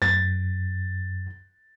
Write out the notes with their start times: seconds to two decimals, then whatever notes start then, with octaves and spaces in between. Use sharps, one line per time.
0.02 F#2 A6